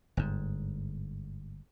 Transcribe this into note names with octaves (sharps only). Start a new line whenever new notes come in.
G1 G#2